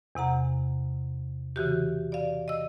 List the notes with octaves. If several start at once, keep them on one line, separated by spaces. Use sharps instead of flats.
E2 C3 F#5 A#5
C#3 E3 F#4 G4
D5 F5
D#5 E6